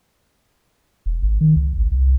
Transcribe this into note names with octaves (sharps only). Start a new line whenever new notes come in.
E1
G#1
D#3
C#2
G#1
C2